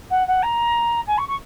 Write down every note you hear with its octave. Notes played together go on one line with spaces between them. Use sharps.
F#5
F#5
A#5
G#5
C#6
C#6